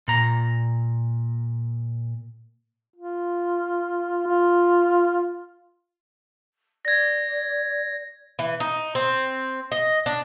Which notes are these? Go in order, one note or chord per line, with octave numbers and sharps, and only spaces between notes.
A#2 A#5
F4
F4
D5 G#6 A#6
E3
D#4
C4
D#5
D4